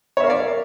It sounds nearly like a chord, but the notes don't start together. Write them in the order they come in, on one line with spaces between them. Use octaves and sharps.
C#5 E5 A#4 F5 D5